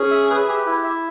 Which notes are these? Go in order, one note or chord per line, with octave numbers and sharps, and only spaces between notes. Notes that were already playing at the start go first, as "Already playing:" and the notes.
Already playing: C#4 G#4
E5
B4
G4
E4
E5